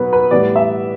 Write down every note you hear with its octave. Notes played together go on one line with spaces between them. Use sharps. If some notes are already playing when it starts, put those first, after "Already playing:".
Already playing: B2 F#3 B3 B4
B4
A2 E3 G3 B3 D5
E5